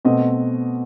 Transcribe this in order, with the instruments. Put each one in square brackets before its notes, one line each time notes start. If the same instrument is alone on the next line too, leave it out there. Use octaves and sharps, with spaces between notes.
[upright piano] B2 A3 C4 D#5